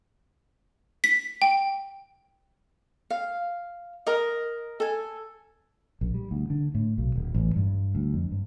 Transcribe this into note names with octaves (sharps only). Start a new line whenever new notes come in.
B6
G5
F5
A#4 D#5
A4 G#5
A#1
G3
D2
D3
A2
B1
D#1
A1
G2
D2
F2
G2